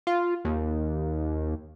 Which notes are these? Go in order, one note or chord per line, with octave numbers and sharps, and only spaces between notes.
F4
D#2